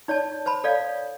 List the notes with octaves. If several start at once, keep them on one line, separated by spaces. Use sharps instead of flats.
D#4 C#5 D5 A5
C5 A5 B5
A4 C#5 D5 F5